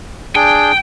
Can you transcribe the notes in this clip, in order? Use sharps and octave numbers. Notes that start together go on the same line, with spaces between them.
D4 G#4 G5